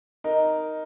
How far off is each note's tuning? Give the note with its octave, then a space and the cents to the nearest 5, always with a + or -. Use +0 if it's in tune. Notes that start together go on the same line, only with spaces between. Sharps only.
D#4 +0 A#4 +0